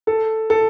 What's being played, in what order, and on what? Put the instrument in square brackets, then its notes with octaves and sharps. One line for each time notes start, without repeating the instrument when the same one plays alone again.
[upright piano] A4
A4